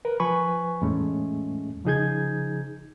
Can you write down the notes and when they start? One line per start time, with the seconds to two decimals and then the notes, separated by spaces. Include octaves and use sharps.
0.05 A#4 B4
0.20 F3 B4 G#5 B5 C#6
0.82 E2 A2 G#3 A3 C#4
1.85 C#3 F3 D#4 G#4 G6 G#6